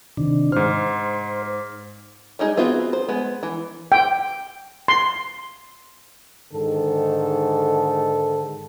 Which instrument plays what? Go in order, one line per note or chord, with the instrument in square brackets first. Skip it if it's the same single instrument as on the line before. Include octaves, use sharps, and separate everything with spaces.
[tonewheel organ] C3 D#3 D4
[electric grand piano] G#2 F6 [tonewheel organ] C5
[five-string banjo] G3 G#3 D#4 G#4
B3 C4 F4 F#4 G#4
C5
G#3 B3
E3
[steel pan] G5
C6
[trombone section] G#2 D3 D#3 A4